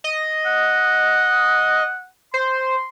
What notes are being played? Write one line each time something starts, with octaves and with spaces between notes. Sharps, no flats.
D#5
F#5
C5 C6